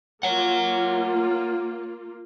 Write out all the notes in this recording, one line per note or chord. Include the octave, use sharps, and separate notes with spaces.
A#3 F4 C#5 F#5